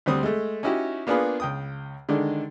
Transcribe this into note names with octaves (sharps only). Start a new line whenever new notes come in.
D2 G3 C4 D#6
G#3 A3
C#4 D#4 E4 F#4 G4
A#3 B3 D4 F4 G#4 B4
C#2 G5 D#6
D3 D#3 G#3 D4